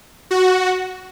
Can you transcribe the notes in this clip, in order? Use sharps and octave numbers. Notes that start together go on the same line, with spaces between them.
F#4